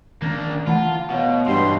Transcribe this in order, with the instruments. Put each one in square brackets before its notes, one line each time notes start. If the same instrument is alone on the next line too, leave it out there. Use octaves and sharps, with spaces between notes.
[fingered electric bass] D#3 C#4 [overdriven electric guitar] A#3 D4
[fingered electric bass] E3 A3 [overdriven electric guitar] F4 [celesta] F#5 A5 B5
[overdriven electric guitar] B2 [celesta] C#5 F5 F#5
[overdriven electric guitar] E2 B2 [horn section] G2 C6